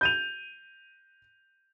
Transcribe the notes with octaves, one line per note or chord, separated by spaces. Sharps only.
G6 D#7 F7